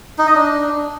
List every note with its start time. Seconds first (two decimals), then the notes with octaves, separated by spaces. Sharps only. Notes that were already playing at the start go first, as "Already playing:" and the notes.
0.19 D#4
0.27 D#5
0.35 D4